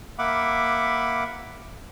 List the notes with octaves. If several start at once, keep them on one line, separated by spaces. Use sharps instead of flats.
A#3 E5 F#5 B5 D6